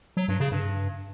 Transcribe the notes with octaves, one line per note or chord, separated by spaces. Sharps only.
F#3
G2
C#3
G2